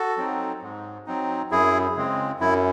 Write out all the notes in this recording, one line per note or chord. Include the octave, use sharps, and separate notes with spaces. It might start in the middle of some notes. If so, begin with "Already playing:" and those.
Already playing: F#4 A4
F#3 C4 D#4
G#2
F#3 C4 D#4
F#2 E4 G#4
C#3 G#3 C4
F#2 E4